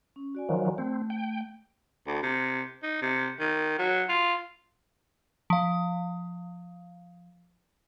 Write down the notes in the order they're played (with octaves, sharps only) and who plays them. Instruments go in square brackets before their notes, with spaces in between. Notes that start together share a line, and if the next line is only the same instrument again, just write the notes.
[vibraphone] C#4
F#4 D5 G#5
[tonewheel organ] D#3 F3 F#3
[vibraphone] A3 [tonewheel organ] C4
[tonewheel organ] G5
[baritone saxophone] D2
C3
D#4
C3
D#3
F#3
F4
[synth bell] F3 F5